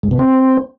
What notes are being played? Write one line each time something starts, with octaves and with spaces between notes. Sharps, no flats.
G#2
B2
C4